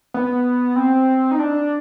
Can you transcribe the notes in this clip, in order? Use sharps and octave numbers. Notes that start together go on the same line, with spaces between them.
B3
C4
D#4
D4